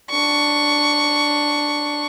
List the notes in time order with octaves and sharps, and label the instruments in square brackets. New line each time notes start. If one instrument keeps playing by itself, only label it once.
[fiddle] D4 C#6